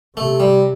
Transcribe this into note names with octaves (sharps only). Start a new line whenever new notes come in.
C3 A3
G3